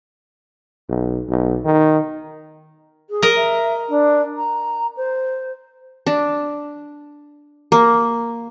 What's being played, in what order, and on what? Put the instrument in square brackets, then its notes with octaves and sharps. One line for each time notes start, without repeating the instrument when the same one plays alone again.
[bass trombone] B1
B1
D#3
[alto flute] G#4
[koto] A#4 D#5
[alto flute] E5
D4
A#5
C5
[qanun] D4
A#3